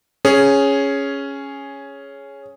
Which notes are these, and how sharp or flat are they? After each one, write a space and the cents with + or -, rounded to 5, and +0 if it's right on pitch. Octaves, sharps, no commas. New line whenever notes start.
C#4 +0 G#4 +0